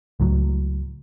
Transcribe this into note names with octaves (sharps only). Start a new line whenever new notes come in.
C#2 A2 F#3